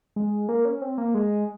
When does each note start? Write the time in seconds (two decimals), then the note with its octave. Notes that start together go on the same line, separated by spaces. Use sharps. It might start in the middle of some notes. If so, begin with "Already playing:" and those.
0.16 G#3
0.49 A#3
0.65 C#4
0.81 C4
0.98 A#3
1.14 G#3